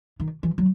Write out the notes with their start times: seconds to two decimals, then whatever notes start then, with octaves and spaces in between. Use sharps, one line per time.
0.20 D#3
0.43 E3
0.58 F#3